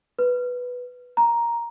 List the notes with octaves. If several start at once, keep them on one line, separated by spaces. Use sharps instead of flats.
B4
A#5